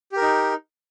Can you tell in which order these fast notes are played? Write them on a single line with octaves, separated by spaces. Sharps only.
G4 A#4 D#4